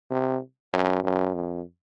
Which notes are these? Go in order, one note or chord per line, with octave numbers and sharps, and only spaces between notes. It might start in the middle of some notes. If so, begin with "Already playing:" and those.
C3
F#2
F#2
F2